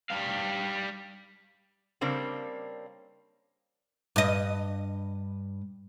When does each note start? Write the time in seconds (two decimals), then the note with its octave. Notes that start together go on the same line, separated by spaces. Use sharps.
0.10 G3 F5
2.01 C#3 G3 A#3 C4 D4
4.16 G2 D#5